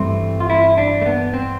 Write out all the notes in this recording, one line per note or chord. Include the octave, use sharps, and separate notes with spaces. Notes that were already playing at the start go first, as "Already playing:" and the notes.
Already playing: G2 E3 A3 C4
F4
E4
D4
A3
B3
C4